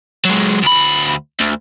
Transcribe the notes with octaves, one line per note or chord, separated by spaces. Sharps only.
F#3 G#3
D2 B5
D2